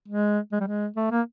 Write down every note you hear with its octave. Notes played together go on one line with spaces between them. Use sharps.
G#3
G#3
G3
G#3
A3
A#3